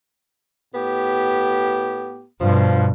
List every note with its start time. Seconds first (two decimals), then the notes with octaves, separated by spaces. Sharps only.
0.74 A2 B3 G4
2.41 G2 B2 F3